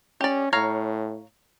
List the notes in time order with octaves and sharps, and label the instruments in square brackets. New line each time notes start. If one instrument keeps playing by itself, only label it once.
[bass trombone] C#4 [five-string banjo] G4 D5
[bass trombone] A2 [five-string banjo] C#5 F5 A#5